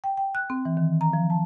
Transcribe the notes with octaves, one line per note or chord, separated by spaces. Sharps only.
G5
G5
F#6
C4
E3
D#3
A#5
F3
A5